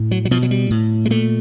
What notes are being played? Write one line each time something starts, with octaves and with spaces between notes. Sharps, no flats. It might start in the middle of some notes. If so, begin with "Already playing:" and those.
Already playing: A2
F#3
F#3
B2 F3
F#3
G3
A2
G#3
A#2 A3